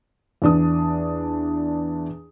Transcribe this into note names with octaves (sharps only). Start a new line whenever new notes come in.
E2 D4 D#6